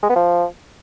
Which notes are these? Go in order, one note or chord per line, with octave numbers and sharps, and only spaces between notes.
G#3
B3
F3